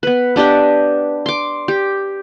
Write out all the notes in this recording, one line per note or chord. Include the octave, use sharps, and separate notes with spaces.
B3 B4
B3 D4 G4 D#5
C6 D6
G4